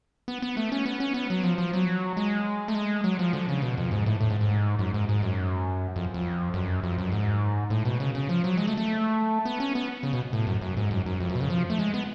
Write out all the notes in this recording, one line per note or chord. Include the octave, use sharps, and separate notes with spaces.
B3
B3
A3
C#4
B3
C#4
B3
F#3
F3
F3
F#3
G#3
A3
G#3
F#3
F3
D3
C#3
B2
F2
G#2
A2
A2
G#2
G#2
F#2
G#2
G#2
F#2
F2
F2
F#2
F2
F#2
G#2
A2
B2
C#3
C#3
F3
F#3
G#3
A3
A3
B3
C#4
B3
C#3
B2
A2
F#2
F#2
G#2
F#2
F#2
F2
F#2
B2
C#3
F3
A3
G#3
B3